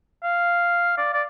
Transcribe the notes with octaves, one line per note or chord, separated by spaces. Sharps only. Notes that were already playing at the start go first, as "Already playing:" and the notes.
F5
D5
D5